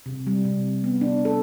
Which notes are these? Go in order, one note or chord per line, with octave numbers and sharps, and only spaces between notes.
C3
G3
C3
B3
D4
A4